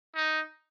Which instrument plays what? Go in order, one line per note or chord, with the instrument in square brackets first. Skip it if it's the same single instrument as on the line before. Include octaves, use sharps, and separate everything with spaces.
[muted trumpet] D#4